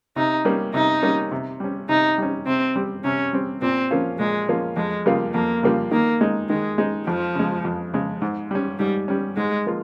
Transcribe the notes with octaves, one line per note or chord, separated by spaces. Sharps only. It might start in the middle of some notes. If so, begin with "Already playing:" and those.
C3 D#4
G3 A#3 C#4
C3 D#4
G3 A#3 C#4
C3
G3 C#4
C3 D#4
G3 C#4
C3 C4
G3 C4
C3 C#4
G3 C4
A#2 C4
F3 A#3 C#4 F4
A#2 G#3
F3 A#3 C#4 F4
F2 G#3
C#3 G3 A#3 F4
F2 A#3
C#3 G3 A#3 F4
D#3 A#3
G#3 D#4
D#3 G#3
G#3 D#4
F2 F3
C#3 G#3
F2
C#3 G#3
G#2
G3 C#4
G#2 G3
G3 C#4
G#2 G#3
F3 A#3 F4